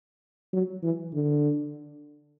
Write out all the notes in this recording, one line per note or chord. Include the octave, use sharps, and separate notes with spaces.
F#3
E3
D3